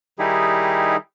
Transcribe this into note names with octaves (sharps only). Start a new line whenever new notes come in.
D#3 G3 D#4 E4 G4 G#4